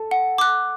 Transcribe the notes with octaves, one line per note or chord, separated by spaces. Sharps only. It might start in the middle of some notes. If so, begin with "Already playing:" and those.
Already playing: A4
F#5
D6 F#6